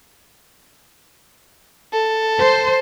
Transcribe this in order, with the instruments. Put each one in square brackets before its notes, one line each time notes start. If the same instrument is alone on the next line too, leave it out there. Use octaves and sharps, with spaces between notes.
[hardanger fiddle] A4
[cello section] C5